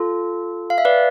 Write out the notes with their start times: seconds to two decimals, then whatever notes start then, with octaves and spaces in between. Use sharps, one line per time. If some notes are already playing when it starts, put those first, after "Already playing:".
Already playing: F4 A4
0.70 F5
0.78 E5
0.85 B4 D5